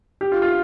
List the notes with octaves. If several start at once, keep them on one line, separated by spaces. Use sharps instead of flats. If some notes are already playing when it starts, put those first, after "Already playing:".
G4
F4
F4